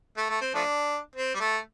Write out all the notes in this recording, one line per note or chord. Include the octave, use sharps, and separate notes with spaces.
A3
A3
C4
F3 A3 D4
C4
G3
A3